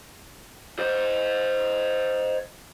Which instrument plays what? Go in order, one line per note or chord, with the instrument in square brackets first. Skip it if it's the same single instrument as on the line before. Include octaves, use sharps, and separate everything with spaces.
[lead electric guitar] C5 D#5